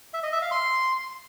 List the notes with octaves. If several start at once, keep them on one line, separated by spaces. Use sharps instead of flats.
E5
D#5
E5
F5
C6